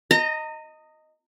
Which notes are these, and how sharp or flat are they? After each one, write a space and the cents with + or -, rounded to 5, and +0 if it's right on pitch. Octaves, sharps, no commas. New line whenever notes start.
D#5 +0 A#5 -35